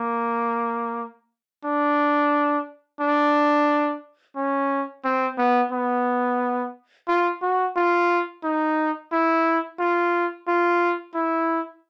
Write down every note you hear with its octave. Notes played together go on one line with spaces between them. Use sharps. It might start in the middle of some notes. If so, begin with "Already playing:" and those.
Already playing: A#3
D4
D4
C#4
C4
B3
B3
F4
F#4
F4
D#4
E4
F4
F4
E4